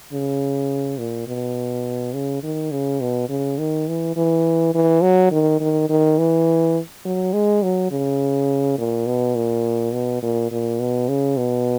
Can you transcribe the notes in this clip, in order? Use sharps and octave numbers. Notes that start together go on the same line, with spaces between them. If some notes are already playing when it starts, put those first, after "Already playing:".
C#3
A#2
B2
C#3
D#3
C#3
B2
C#3
D#3
E3
E3
E3
F#3
D#3
D#3
D#3
E3
F#3
G#3
F#3
C#3
A#2
B2
A#2
B2
A#2
A#2
B2
C#3
B2